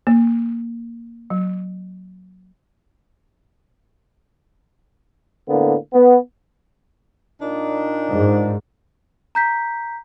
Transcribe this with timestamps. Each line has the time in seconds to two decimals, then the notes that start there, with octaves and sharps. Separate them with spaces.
0.07 A#3
1.30 F#3
5.48 A2 D3 A#3 B3
5.93 B3
7.42 A#2 D4 D#4
8.10 G#2
9.35 A#5 G6 B6